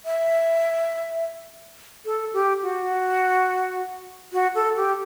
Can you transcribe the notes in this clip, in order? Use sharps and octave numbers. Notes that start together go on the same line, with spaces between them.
E5
A4
G4
F#4
F#4
A4
G4